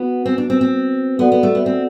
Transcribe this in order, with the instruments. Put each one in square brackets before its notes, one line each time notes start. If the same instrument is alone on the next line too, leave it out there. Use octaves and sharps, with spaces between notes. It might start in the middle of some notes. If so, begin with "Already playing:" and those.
Already playing: [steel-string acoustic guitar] B3 [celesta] F#4 B4
[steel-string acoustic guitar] C4
D4
C4
C4
[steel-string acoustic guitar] B3 [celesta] F#4 A4 D5 F#5
[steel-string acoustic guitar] B3
A3
B3
C4